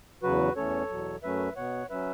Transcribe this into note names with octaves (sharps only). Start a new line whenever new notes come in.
E2 C#3 F#3 F#4 B4
E2 E3 A3 C#4 A4 C#5
E2 B2 F#3
F#2 F#3 A3 C#4 B4 E5
B2 B3 C#5 F#5
F#3 C#4 B4 E5